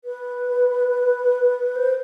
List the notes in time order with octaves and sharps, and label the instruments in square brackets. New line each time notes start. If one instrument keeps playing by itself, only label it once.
[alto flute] B4
C5